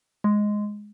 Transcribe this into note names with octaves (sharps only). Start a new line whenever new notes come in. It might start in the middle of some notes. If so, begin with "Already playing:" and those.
G#3